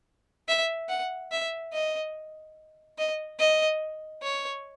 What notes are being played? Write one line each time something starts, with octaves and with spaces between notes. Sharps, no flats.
E5
F#5
E5
D#5
D#5
D#5
C#5